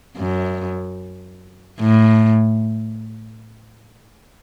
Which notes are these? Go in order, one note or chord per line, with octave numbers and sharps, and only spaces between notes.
F#2
A2